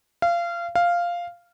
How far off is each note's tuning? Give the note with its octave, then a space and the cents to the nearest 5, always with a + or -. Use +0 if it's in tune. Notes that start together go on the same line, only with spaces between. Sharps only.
F5 -25
F5 -5